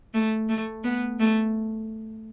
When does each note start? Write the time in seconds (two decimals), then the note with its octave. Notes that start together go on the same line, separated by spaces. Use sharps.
0.14 A3
0.49 A3
0.84 B3
1.20 A3